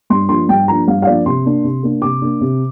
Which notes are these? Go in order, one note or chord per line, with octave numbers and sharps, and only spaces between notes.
G2 C6
F3 A#3 D4 C6
G2 G5
F3 A#3 D4 A#5
G2 F5
F5
F3 A#3 D4 D5
C3 C6
A#3 D4
C3
A#3 D4
C3 D6
A#3 D4
C3